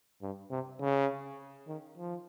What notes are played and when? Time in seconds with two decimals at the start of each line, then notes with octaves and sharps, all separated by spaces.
0.22 G2
0.51 C3
0.81 C#3
1.68 D#3
1.98 F3